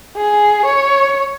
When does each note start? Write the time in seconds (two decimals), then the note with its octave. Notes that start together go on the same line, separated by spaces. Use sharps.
0.17 G#4
0.66 C#5